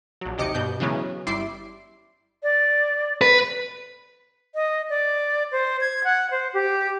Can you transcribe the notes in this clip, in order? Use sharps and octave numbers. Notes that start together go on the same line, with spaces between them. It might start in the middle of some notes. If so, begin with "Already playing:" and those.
A#1 F#3
D#2 C3 G4 D#5 D6 C#7
G2 B2 G6
C#3 E3 F#3 G#3 B3 C#4
G1 G3 E4 C6 D6 C7
D5
B4
D#5
D5
C5
G#6
F#5
C5
G4